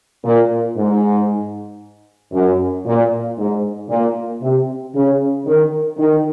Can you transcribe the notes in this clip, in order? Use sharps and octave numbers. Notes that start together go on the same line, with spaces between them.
A#2
G#2
F#2
A#2
G#2
A#2
C3
C#3
D#3
D#3